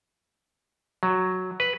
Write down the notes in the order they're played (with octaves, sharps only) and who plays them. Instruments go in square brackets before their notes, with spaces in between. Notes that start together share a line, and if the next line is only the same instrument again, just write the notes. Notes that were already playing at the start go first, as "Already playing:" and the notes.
[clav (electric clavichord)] F#3
B4